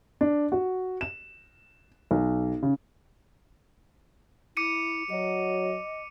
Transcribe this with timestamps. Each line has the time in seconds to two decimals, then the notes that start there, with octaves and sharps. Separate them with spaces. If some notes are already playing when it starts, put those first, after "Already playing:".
0.21 D4
0.52 F#4
1.01 E7
2.11 B1
2.63 C#3
4.57 E4 D6 C#7 D#7
5.10 F#3 D#5